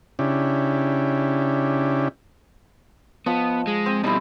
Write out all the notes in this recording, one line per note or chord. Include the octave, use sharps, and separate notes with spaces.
C#3 C#4 D4 E4 G4
F3 B3 D#5
G#3
C4
B2 G3 D#4 E4